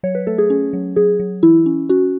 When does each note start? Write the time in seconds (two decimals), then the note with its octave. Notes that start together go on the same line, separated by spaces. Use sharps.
0.03 F#3 C#5
0.15 B4
0.27 A3 A4
0.38 G#4
0.50 C#4
0.73 F#3
0.96 F#3 G#4
1.20 F#3
1.43 E3 E4
1.66 C#4
1.89 C#4 F#4